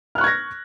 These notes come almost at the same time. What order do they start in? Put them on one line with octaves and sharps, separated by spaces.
F6 F#6 C#6 G#6 A#6